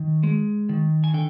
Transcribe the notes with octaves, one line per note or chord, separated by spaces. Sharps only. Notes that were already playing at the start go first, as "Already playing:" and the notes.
Already playing: D#3
G#3
D#3
G#5
D3 G5